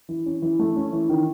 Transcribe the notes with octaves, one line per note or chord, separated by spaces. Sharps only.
E3
C#4
E3
A3
C#4
E3
D#3